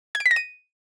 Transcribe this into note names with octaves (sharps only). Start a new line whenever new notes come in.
G#6
D7
B6
A#6
D#7